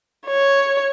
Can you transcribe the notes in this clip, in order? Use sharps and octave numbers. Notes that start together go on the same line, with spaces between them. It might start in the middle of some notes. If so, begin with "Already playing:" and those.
C#5